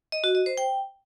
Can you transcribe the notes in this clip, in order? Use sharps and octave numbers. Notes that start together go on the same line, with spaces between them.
D#5
F#4
D#5
C5
G5